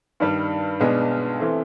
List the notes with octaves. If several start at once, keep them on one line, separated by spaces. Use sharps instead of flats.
G2 D#3 G3
B1 B2 G#3 B3 D4
C3 E3 A3 C4